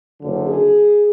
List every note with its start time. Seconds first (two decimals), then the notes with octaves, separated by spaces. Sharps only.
0.20 F#1 F#2 D3
0.49 G#4